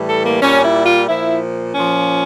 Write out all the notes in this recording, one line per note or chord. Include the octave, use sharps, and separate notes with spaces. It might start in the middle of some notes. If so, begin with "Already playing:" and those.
Already playing: A2 E3 G3
A4
A#3
A#2 G3 C#4
E4
F4
A#2 F3 E4
A#2 F3 C#4